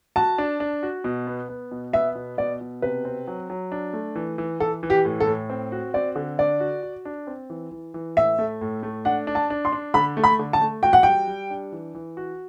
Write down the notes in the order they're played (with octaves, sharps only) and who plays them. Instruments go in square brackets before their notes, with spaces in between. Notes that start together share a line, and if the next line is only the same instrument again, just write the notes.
[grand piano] F#4 [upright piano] A5
[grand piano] D4
D4
F#4
B2
B3
B3
B2
[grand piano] B3 [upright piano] E5
[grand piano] B2
[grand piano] B2 [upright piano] D5
[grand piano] B2
[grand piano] C3 [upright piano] B4
[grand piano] C4
F#3
F#3
D4
A3
E3
E3
[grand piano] E3 [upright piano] A4
[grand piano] E3
[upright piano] G4
[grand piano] A2
[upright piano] A4
[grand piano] A2
C4
F#4
[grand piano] C4 [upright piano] D5
[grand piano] D3
[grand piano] D4 [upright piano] D5
[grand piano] F#4
F#4
D4
C4
E3
E3
E3
[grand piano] A2 [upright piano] E5
[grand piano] A3
A2
A3
[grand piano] D4 [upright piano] F#5
[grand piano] D4
[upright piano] A5
[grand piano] D4
[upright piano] C6
[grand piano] D4
[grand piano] D3 [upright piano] B5
[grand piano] A3
[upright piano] B5
[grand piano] D3
[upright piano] A5
[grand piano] A3
[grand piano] F#4 [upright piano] G5
[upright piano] F#5
[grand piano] G3 [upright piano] G5
[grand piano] G3
D4
E3
E3
F#4